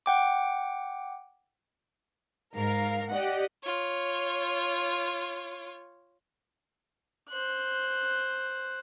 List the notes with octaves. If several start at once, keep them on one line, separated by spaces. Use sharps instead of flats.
F#5 G5 D6
G#2 A#4 F5
G4 D5 D#5 F#5
F4 C#5
C5 F#6